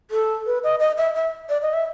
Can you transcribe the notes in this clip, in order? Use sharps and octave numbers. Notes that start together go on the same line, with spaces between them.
A4
B4
D#5
D#5
E5
E5
D5
D#5
E5